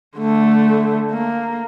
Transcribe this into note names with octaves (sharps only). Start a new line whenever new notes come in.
D3 A3
A#3